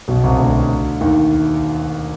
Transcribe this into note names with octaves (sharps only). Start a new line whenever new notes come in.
B1 B2
C2 C3
D2 D3
D#2 D#3